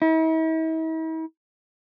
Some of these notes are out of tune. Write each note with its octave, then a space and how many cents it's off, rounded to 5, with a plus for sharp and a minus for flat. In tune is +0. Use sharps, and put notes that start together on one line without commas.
E4 -45